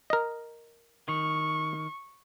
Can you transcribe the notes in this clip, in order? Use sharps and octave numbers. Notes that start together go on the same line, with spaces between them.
A#4 D#5
D#3 C#6